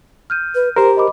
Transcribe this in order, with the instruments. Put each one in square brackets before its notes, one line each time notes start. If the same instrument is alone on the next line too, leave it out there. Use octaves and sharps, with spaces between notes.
[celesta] F6 G6 D#7
[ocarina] B4
[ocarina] G4 [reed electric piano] A#4 C5 [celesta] A#5
[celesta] D#5 B5 D6